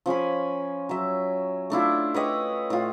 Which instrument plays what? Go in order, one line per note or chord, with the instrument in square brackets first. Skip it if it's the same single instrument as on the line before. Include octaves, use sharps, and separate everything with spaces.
[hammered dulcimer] F3 C#4 G#5 B5
F#3 E5
A3 D4 E4 F4
B4 C#5 D#5 G5
A2 F4